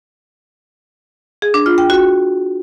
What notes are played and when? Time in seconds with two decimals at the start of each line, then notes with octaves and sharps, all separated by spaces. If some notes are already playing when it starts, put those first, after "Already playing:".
1.42 G#4
1.54 D4
1.66 F4
1.78 G5
1.90 F#4